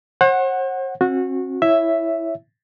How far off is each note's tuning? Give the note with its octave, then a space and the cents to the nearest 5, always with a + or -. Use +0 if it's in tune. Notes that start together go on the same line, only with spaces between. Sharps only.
C5 +45 F#5 +0
C4 +40 F#4 -20
E4 +0 C#5 +0 E5 +0